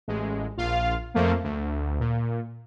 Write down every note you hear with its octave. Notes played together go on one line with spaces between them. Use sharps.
A1 G#3
A#1 F4 F5
F2 F3 A3 A#3
D2
A#2